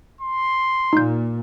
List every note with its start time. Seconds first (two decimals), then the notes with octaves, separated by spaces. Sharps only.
0.21 C6
0.93 A#2 D#4 G6